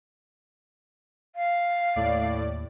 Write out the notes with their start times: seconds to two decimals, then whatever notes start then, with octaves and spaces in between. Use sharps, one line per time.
1.36 F5
1.96 D#2 A2 D5